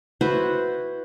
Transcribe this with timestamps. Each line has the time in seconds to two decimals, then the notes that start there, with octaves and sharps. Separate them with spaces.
0.21 E4 F#4 B4 C5